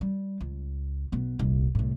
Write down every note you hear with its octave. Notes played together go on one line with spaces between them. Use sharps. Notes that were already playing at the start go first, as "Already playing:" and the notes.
G3
C#2
B1 B3
D#1 C2
C2 A2